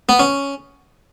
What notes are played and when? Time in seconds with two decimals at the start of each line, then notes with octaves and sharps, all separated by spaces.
0.09 B3
0.19 C#4